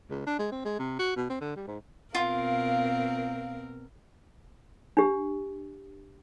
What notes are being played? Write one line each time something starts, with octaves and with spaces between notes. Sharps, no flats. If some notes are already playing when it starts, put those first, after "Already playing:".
C#2
D4
G#3
C4
G#3
C3
F#4
B2
C4
D3
G3
G#2
B2 C4 F4 A#4 F5
D4 G4